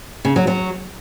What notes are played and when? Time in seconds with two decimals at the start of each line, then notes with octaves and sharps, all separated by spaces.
0.25 C#3
0.36 F#3
0.47 F#3